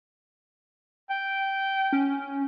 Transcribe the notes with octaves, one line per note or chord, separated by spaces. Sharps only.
G5
C#4